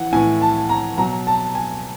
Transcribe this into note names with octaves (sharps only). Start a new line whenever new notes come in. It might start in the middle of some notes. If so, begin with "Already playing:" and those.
Already playing: E3 F#5
A2 E3 G#5
A5
A#5
B2 F#3 A#5
A5
G#5